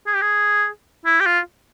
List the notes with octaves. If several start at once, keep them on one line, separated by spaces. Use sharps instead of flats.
G#4
G4
G#4
E4
G4
F4